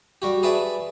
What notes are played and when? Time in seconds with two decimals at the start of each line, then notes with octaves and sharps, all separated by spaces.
0.22 G3 F#4 G4
0.43 G#4 B4 D5 E5 A5